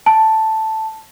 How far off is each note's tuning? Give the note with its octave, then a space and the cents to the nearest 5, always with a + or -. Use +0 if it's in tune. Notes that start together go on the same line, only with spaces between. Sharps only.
A5 +0